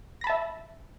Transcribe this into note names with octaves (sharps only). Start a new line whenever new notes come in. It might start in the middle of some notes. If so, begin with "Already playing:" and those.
E5 A5 B5 A#6